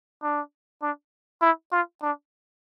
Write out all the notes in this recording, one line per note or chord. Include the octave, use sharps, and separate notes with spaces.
D4
D4
E4
F4
D4